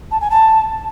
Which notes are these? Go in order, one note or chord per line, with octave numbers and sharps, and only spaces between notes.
A5
G#5
A5